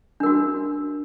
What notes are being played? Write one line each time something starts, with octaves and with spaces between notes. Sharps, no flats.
D4 F#4 A#4